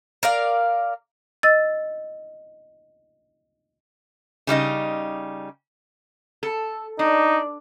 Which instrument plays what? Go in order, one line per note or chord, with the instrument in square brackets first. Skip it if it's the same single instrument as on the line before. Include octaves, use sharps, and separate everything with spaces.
[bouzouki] A#4 D5 F5
[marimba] D#5 E6 A6
[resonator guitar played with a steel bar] C#3 G3 D#4 D#5
A4
[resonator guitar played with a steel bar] D4 [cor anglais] D#4